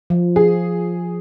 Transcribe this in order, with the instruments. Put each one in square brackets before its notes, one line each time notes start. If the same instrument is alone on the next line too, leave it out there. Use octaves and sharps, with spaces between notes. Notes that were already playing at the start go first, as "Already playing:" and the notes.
[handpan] F3
[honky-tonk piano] G#4